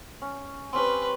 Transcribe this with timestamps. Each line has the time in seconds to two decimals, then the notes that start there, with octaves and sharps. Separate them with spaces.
0.22 C#4
0.73 C4 C#4 G4 B4 C6